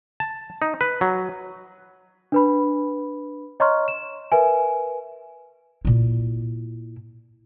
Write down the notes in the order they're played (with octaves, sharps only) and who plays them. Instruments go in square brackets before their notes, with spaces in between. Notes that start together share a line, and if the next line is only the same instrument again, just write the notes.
[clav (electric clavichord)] A5
D#4
B4
F#3
[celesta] D4 B4 B5
C#5 D#5 A#5 C6 C#6 F6
E7
A#4 B4 E5 G#5
[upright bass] A#2 E4